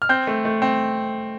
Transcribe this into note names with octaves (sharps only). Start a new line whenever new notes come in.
F6
C4 G6
A3
A3
C4